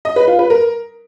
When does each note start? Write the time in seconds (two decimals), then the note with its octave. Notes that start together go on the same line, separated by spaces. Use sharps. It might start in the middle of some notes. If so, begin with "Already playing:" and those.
0.05 D#5
0.16 B4
0.28 F4
0.39 B4
0.50 A#4